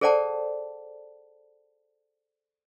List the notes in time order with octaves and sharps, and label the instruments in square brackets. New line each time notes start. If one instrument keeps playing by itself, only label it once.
[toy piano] G#4 A4 C5 D5 F#5 A5